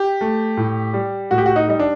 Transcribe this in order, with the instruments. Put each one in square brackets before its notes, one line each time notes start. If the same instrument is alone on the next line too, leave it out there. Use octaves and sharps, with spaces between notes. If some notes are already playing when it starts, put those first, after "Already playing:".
Already playing: [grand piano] G4
A3
A2
G3
A2 F#4
G4
F#4
D#4
G3 D#4
D4